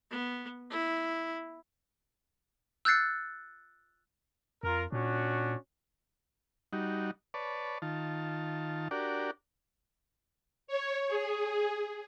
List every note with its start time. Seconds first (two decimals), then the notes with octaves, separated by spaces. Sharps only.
0.11 B3
0.70 E4
2.85 E6 F#6 G6 A6 C7 C#7
4.63 F2 F4 A#4
4.92 A#2 C#4 D4 F#4
6.73 G3 D#4 F#4
7.34 B4 C#5 D5 A5
7.82 D#3 F4 A5
8.91 D4 F#4 G4 A#4 D5
10.67 C#5
11.08 G#4